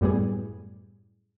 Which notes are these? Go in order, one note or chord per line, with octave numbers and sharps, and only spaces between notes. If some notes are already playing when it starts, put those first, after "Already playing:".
F#2 A2 G3 B3 G#4